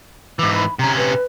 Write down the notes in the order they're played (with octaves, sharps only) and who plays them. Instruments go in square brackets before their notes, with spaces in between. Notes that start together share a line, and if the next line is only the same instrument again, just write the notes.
[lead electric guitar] G#2 E3 [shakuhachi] D6
[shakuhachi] B5
[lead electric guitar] C3 C#4 [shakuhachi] A#5
[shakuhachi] B4